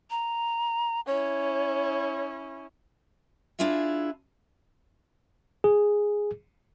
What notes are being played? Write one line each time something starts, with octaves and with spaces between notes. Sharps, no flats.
A#5
C#4 E4 C#5
D4 E4 F4 G#4 E5
G#4